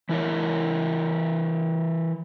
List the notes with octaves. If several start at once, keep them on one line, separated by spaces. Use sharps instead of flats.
E3 E4 A#4 C#5